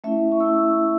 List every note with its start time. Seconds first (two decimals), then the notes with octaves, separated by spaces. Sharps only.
0.04 A3 C#4 E4 E5
0.32 C#6
0.40 A3 C#4 E4 E6